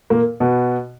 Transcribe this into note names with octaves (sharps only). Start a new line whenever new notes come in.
A#2 A#3
B2 B3